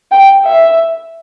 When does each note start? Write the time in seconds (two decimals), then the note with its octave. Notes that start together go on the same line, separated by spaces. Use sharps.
0.12 G5
0.45 E5